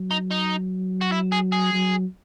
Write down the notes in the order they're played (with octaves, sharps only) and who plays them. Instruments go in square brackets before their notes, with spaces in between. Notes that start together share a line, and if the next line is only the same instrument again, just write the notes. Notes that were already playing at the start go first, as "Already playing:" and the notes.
Already playing: [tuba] F#3
[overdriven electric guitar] D#4
D#4
F#4
E4
G#4
G#4
[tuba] F#3